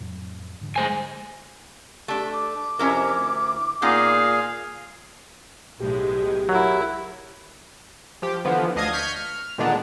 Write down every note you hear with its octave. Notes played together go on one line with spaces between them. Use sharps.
F2 A2 F#3
G#2 D3 F3
G#3 C5 G#5
A3 D4 G4
D6
F2 C3 C#4 E4 A#4
D2
A#2 B3 D#4 F4 G#4 F5
B1 A2 G#3 G4
F#3 E4 A#4
F3 G4
D3 E3 F3 B3
D2 D4 D#5 F5 D#6 G#6
C#6 F6 G6 G#6 B6 C#7
F6
A#2 D3 D#3 G#3 B3 D4